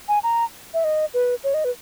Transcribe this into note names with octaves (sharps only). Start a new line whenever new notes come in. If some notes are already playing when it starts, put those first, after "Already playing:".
G#5
A#5
E5
D#5
B4
C#5
D#5
B4